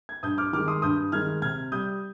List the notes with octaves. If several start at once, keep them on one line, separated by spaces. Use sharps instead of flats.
G#6
G2 D#6 G6
D6 F6
D#3 G#3 D6 F6
C6 D#6
G2 D#6 G6
D#3 G#3 F6 G#6
C3 F6 G#6
G3 D#6 G6